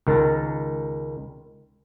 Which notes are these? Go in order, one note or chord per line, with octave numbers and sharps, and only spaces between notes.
C#2 D#3 A#4 A5